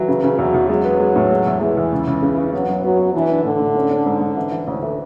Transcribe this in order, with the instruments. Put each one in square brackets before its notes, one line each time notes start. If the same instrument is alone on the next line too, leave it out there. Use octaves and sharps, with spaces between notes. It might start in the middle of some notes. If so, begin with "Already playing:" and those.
Already playing: [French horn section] E3 [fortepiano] F#3
[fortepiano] C#3
C#3
[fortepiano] E2 [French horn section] F#3
[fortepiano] E2
[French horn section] F#3 [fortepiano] G#3
[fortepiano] B3
G#3
A2
G#3
E2
[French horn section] E3 [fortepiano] G#3
[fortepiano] E2
C#2
C#2
C#3
C#3
[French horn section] F#3 [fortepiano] B3
[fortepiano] F#2
[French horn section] F#3 [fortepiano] B3
[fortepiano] B3
[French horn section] E3 [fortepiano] D4
[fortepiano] D4
[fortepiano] A2 [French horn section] D3
[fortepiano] A2
C#4
C#4
G#2
G#2
E3
E3
[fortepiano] D2 [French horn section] A2
[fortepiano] E3